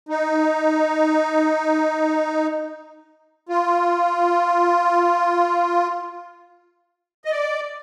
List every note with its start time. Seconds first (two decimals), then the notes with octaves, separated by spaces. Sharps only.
0.09 D#4
3.49 F4
7.25 D#5
7.31 D5